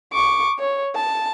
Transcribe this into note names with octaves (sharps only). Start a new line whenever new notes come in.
C#6 D6
C#5
A5